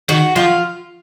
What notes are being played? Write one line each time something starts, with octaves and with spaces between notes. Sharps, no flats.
D#3 F#4
F3 F4